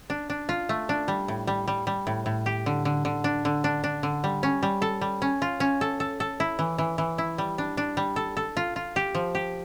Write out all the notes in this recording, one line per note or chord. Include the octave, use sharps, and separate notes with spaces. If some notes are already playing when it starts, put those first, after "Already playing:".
D4
D4
F4
A3
D4
G3
A2
G3
G3
G3
A2
A2
G4
D3
D3
D3
D4
D3
D4
D4
D3
G3
C#4
G3
A4
G3
C#4
F4
C#4
A4
A4
A4
E4
E3
E3
E3
E4
G3
D4
D4
G3
A4
A4
F4
F4
G4
F3
G4